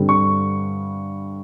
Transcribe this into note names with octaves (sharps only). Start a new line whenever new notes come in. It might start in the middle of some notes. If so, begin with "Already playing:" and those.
Already playing: G2 D3 G3 C4
C#6